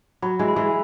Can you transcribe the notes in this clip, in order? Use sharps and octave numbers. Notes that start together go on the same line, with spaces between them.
F#3 B5
E3 G#3
B5
E3 G#3